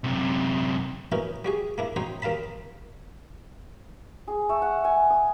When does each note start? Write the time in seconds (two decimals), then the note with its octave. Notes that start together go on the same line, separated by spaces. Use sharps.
0.04 F#2 C3
1.12 B3 C#4 D#4 E4 F#4 A#4
1.45 G3 F#4 G#4
1.78 A#3 D4 E4
1.96 C4 D#4 F#4 C5 C#5
2.22 D#2 A#4 F5 A5 B5
4.28 G#4
4.49 A3
4.62 F#5
4.84 G#5
5.10 D#6